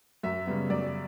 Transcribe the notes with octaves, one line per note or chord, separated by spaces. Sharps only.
F#2 E5
C#3 G3 B3
F#2 D5